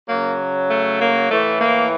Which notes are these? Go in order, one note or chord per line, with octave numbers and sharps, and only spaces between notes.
C#3 F#3 A#3
A3
A#3
A2 E3 A3
A#3